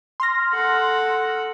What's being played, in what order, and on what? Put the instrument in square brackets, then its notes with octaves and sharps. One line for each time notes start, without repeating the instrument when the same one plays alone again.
[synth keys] C6 F6 A#6
[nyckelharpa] A4 F#5